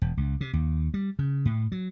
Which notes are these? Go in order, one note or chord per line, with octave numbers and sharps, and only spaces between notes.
E1
C#2
C3
D#2
G3
C#3
A2
F#3